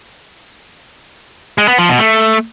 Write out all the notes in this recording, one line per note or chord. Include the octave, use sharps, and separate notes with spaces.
G#3
B3
F3
B2
A3